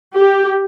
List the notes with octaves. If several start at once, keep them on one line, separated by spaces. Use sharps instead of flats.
G4